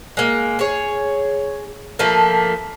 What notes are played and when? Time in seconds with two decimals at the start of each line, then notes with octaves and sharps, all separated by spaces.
0.17 G#3 A#3
0.59 G#4 C#5
1.99 F3 A3 A#3